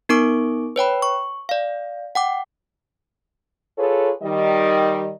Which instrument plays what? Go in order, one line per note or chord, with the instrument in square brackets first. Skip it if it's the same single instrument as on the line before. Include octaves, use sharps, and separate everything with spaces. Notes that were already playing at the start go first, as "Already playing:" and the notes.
[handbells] B3 D#4 A#4 C#6 D6 D7
B4 C#5 G5 B5
C#6
D5 F5
F#5 G5 D6
[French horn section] F4 G#4 A4 B4 C#5
D#3 G3 D#5